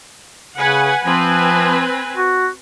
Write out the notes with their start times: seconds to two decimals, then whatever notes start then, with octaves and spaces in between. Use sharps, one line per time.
0.57 C#3 B4 F#5 G#5
1.05 F3 C4 B4 G#5
2.17 F#4